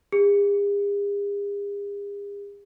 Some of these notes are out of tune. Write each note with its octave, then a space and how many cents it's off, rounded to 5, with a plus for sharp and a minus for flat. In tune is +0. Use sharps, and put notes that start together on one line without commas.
G#4 -45